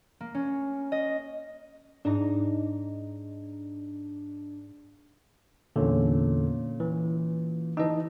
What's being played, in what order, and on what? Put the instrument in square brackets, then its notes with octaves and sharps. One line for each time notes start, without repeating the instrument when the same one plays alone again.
[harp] A#3
C#4
D#5
[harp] G#2 D#4 A#5 [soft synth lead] D4
[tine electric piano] E2 D3 [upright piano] A#2 C#4
[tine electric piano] E3
[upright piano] E3 A5 E6 [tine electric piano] D#4 D#5